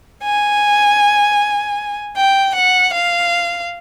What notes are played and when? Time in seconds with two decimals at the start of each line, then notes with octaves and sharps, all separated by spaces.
0.23 G#5
2.16 G5
2.55 F#5
2.93 F5